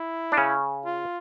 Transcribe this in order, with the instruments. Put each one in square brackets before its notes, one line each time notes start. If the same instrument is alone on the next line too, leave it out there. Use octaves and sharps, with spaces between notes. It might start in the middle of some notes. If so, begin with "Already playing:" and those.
Already playing: [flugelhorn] E4
[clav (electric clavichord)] D4
C#3 C#4
[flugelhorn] F4